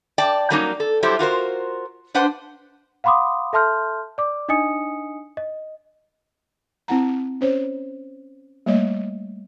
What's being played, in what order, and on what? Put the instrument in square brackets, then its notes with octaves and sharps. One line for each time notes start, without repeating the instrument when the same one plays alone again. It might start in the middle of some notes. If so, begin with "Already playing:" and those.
[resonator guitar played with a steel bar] D5 G5 A5
F#3 G3 A#3 C#4 D#4
A4
F#3 G3 E4 G4 A4 C5
F4 F#4 A#4 C5
D4 B4 C5 F#5
[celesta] F5 F#5 B5 C6 D6 D#6
A4 E5 A5 C6 F6 G6
D5 D6
D4 D#4 D#5 G#5 D#6 C#7
D#5
[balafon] C4 E4 F#5 A#5
C#4 C5 C#5
G3 A3 A#3 C#5 D#5